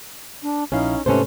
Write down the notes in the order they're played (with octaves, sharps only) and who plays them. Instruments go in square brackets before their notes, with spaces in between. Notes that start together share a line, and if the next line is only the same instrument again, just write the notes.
[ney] D4
[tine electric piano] A#1 E4 F5 [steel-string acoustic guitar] C#4 [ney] D#4
[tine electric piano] G#2 C3 A3 [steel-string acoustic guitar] C#4 A4 C5 [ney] B4